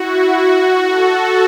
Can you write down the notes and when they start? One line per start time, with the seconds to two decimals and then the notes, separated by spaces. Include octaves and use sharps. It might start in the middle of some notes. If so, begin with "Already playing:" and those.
Already playing: E4 F#4
0.37 F#4
0.85 A4